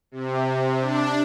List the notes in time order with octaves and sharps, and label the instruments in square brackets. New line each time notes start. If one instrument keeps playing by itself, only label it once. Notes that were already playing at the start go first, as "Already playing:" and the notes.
[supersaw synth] C3
D4